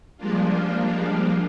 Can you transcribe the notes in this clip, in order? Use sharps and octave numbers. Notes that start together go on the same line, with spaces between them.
F3 G3 G#3 A#3 D4 F4